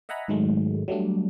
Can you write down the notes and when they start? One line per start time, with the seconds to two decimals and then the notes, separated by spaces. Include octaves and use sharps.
0.09 D#5 E5 F#5 G#5 A#5 B5
0.28 G#2 D#3 F#3 G#3 A3
0.88 F#3 G3 A3 D4